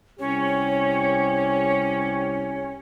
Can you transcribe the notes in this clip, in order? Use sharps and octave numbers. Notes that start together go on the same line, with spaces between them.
C2 C#4 G4 C#5